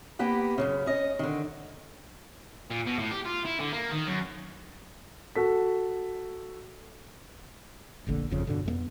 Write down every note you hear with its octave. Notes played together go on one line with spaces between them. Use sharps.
A#3 B3 G4 F#5
F#2 A2 C#3
C#4 D#5
D3 D#3
A#2
B2
A2
G4
F4
E4
D3
A#3
D#3
F#2
F#4 A4 B6
F1 A#1 D3 A#3
G1 F2 C#3
G2 B2 D3
F2 A3 B3